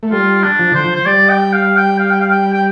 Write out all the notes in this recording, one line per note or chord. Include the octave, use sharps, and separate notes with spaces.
A3
G3 F4
D4
F3
D3 C5
F3
C5
G3 D5
G5
F5
G5
F5
G5
F5
G5
G5